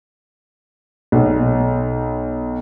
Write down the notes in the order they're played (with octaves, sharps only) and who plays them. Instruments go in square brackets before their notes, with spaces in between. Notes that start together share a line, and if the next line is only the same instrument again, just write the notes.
[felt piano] B1